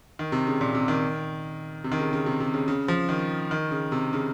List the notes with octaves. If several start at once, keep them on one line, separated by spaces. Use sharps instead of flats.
D#3
C3
C#3
A#2
C3
D#3
C3
D#3
C#3
C#3
C3
C3
C#3
C#3
F3
D#3
D#3
C#3
C3
C#3